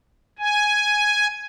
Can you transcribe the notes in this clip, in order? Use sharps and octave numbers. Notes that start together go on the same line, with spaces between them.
G#5